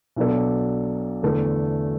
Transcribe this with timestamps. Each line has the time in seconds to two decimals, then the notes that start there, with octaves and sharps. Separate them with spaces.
0.16 B1 B2 F#3 D4 A4
1.23 E2 D3 A3